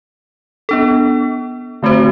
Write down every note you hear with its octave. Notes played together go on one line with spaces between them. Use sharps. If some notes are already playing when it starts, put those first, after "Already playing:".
B3 D4 A4
D3 A3 C4 F#4 C5